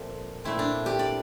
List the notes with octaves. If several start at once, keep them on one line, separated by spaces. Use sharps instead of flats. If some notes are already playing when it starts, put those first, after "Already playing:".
Already playing: A#2 F3 A3 C4
A#2 A3 C4 E4
D4
G4
D5